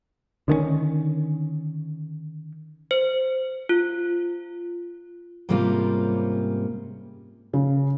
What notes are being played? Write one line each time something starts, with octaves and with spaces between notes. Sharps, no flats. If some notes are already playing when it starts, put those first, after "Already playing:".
D3 D#3 G#3 C#4
C5
F4
G#2 C3 G3 A#3 C#4 F4
C#3